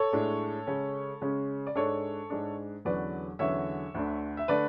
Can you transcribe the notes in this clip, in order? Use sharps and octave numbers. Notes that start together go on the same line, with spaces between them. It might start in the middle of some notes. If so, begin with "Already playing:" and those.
Already playing: A4 C#5
A2 G#3 D4
C#3 G#3 C#4
C#3 G#3 C#4
D5
G#2 G#3 D4 A4 C#5
G#2 G#3 D4
E2 D3 F#3 C#4 B4 D5
E2 D3 F#3 C#4 C#5 E5
D2 D3 A3 D4
E5
D3 A3 D4 B4 D5